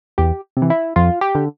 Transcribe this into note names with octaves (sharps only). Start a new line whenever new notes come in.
E2 G4
C3
E3
E4
F2 F4
G4
D3